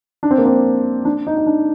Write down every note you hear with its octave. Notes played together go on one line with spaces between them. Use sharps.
D4
C4
A#3
C4
D4
D#4
D#4
D4